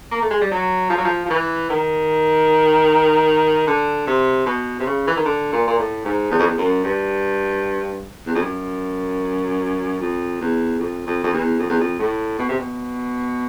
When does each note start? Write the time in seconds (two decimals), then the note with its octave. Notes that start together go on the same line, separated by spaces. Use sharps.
0.12 A#3
0.22 A3
0.31 G#3
0.41 G3
0.51 F#3
0.90 F3
0.98 F#3
1.05 F3
1.26 F3
1.30 E3
1.70 D#3
3.67 D3
4.07 C3
4.46 B2
4.80 C3
4.86 C#3
5.08 E3
5.17 D#3
5.25 D3
5.52 A#2
5.68 A#2
5.79 A2
6.05 G#2
6.31 E2
6.39 F2
6.47 E2
6.58 F#2
6.84 G2
8.27 E2
8.35 F2
8.42 F#2
10.01 F2
10.41 E2
10.80 F2
11.06 F2
11.24 F2
11.33 E2
11.59 F2
11.70 E2
11.80 F2
11.99 A2
12.39 B2
12.49 C3
12.59 B2